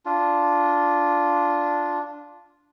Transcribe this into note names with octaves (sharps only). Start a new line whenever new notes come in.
D4 F4